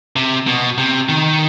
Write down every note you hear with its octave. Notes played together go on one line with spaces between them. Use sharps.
C3
B2
C3
D#3